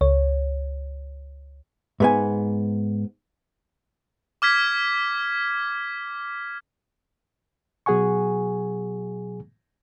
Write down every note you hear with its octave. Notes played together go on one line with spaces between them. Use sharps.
C#2 C#5
G#2 B3 G#5
D6 F6 G#6 B6
B2 F#3 G#4 F#5 G#5 C#6